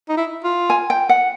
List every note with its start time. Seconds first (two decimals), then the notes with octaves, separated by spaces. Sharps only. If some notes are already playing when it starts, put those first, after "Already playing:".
0.09 D#4
0.17 E4
0.44 F4
0.70 G#5
0.90 G5
1.09 F#5